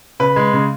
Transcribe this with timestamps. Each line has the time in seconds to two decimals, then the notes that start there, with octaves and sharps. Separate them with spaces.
0.20 C#3 B4
0.36 G#3
0.53 C#3